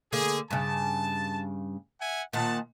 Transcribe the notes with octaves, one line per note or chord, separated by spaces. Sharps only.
D3 A#3 G#4
G2 C#3 A5
E5 F#5 G#5
A#2 D#3 F#5 A5